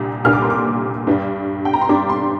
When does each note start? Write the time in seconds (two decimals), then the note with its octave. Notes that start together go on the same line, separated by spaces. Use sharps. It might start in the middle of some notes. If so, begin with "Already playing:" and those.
Already playing: C2 A#2 G3 D4
0.24 C2 A#2 G3 A#3 D4 F6
0.33 D6
0.42 C6
0.50 D6
1.07 G2 G3 D4
1.65 G5
1.73 A#5
1.81 C6
1.89 G2 G3 D4 D6
2.09 C6